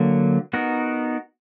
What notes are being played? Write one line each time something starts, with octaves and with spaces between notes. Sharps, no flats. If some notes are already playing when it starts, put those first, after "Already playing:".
Already playing: D3 F#3 A#3
B3 D#4 F#4 A#4